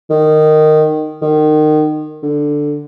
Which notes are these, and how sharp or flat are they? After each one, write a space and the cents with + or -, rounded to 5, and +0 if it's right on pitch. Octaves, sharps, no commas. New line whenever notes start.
D#3 -15
D#3 -25
D3 +5